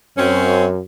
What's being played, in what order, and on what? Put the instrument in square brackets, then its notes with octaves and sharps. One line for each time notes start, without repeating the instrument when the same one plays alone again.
[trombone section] F#2 [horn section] C4 C#4